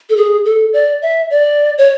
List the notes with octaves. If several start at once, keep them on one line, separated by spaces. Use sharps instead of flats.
A4
G#4
A4
D5
E5
D5
C#5